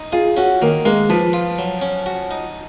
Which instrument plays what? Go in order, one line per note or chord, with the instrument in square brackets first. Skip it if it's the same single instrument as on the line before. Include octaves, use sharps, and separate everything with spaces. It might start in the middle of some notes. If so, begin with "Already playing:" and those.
Already playing: [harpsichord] D#4
[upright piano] F4 [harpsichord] G#4
[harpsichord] C#4 [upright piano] F#4
[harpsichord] D#3 [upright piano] A#3
[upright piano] G#3 [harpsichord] A#3
[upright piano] F3 [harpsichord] B4
[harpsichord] F4
F#3
C#4
F#4
D#4